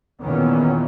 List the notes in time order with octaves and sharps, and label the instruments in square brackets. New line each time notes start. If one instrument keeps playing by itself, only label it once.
[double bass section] E2 A#2 D#3 E3 B3 C#4